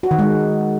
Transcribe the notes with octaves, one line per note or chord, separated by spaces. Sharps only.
F#4
D#3
G#3